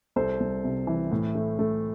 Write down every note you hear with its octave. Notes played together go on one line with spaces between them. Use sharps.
C2 A4 C5
C2
C3
E3
A2
A3
A3